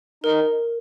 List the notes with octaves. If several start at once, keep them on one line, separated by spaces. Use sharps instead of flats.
D#4 A#4